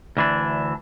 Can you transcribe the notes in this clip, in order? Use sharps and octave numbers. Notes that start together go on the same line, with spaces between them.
D2 E3 D4